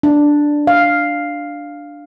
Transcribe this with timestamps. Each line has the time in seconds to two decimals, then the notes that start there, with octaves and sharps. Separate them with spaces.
0.03 D4
0.67 F5